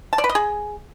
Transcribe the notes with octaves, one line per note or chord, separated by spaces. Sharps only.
A5
D5
B4
D#5
G#4